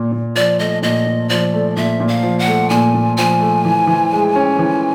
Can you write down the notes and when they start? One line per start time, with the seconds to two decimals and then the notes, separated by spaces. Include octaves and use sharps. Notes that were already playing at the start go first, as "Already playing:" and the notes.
Already playing: A#2
0.12 A#2
0.35 F3 D5
0.59 A3 D#5
0.82 A#2 D#5
1.06 A#2
1.29 F3 D5
1.54 A3
1.76 A#2 E5
2.00 A#2
2.08 F5
2.23 F3
2.39 F#5
2.47 A3
2.70 A#2 G#5
2.94 A#2
3.17 F3 G#5
3.40 A3
3.65 E3
3.87 E3
4.12 G#3
4.35 C#4
4.59 E3